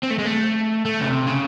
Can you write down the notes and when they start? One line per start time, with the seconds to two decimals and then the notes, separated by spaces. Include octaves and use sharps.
0.03 C4
0.10 A3
0.19 G#3
0.25 A3
0.85 A3
1.01 C#3
1.07 C3
1.27 C#3